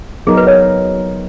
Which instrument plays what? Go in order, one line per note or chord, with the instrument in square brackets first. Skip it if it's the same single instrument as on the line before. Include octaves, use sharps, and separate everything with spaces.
[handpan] F#3 B3 D#4 A#4 [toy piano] G#4
[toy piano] B4
C#5